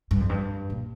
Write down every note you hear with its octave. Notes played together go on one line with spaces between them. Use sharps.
G2
F2
G2
A#2